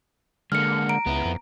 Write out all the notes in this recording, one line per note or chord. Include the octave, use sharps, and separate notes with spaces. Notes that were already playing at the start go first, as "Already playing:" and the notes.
D3 G#3 A#3 F6 C#7
A#5 D7
C#2 B3 E4
F2